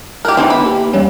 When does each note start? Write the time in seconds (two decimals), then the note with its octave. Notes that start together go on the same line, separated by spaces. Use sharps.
0.25 G4 A#4 F6 F#6
0.37 D3 E3 B3 C4 D#4
0.50 B5
0.63 A#3 G4
0.93 E2 G3 C#4